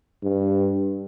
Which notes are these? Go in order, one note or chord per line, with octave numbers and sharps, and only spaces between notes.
G2